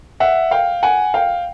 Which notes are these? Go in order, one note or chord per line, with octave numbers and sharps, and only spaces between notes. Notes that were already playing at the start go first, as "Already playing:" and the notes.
E5 F#5
F5 G5
F#5 G#5
F5 G5